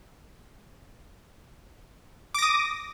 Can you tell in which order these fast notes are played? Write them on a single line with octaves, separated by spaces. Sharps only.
D6 A#6 D#6